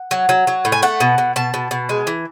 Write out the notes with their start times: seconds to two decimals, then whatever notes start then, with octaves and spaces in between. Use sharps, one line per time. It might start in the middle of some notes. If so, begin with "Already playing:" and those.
Already playing: F#5
0.11 F#3
0.29 F#3
0.47 F#3
0.65 A2
0.72 G#5
0.82 A3 F#5
1.00 B2
1.18 B2
1.36 B2 A5
1.54 B2
1.71 B2
1.89 G#3
2.07 E3